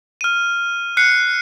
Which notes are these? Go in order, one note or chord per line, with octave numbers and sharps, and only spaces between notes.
F6 D#7
F#6 C7 C#7